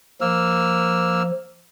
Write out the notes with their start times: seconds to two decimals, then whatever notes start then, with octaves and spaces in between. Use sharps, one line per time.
0.21 F3 A#3 E6 F6